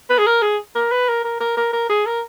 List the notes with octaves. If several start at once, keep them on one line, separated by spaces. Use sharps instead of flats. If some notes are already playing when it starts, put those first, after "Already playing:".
B4
G#4
A#4
G#4
A#4
B4
A#4
A#4
A#4
A#4
A#4
G#4
A#4